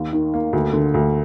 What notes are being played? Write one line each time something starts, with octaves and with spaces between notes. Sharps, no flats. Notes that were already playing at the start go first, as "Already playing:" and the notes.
Already playing: D#2
D#3
A#3
D2
D3
D2